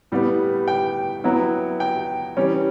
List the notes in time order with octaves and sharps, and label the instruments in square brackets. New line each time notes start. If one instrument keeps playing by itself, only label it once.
[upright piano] A2 G3 B3
G5
F#3 B3 E4
G5
E3 G3 C#4